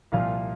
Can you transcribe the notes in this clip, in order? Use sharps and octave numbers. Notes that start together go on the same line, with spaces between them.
C2 A#2 F3 F4 F5